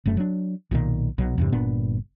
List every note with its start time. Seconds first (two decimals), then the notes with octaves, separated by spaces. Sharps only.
0.06 F1 F#2 A3
0.17 F#3 D4
0.71 B1 A#2 D3 D#3
1.18 B1 B2 F#3
1.38 E2 G2 C3
1.52 G1 A#2 B3 D4